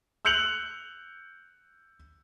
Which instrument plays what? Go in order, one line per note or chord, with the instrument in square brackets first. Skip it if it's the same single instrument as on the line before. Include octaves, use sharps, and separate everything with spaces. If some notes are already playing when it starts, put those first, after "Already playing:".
[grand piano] E6 F#6 G6 C#7 F7 F#7